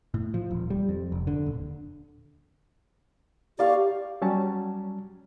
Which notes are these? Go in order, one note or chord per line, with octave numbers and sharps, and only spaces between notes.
A2
F3
D#1
G3
F2
F1
D3
D#1
G4 D5 F5 C#6
F#3 G3 C#4 A5